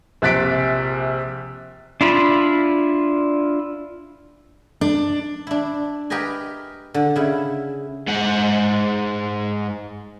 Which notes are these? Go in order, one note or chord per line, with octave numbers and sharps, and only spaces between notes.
A#1 C3 F#6 A6 B6 D7
D4 E4 F4 B5
D4
D4 E4
G4 A#4 B4 D#5 G#5
D3
C#3 E4
G#2 F#5